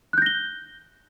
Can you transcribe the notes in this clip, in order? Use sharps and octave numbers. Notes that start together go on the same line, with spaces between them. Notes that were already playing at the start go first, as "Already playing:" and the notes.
F#6 G6 A#6 G7